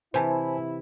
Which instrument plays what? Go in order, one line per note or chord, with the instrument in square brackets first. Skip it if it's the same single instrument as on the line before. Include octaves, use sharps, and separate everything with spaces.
[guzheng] C3 E3 [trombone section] E4 [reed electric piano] C5 G#5 A5